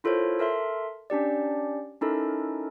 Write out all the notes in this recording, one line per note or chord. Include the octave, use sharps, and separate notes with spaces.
E4 F4 A4 A#4 C5 C#5
A4 A#4 E5 C6
C#4 D4 G4 D5
C#4 D#4 E4 A4 A#4